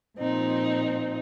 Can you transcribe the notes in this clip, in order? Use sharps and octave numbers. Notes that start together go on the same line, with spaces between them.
A#2 F3 C4 D#4